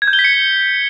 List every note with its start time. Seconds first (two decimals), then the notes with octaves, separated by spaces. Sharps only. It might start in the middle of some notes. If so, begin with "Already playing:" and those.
0.02 G#6
0.08 G6
0.13 G7
0.19 B6
0.24 C#7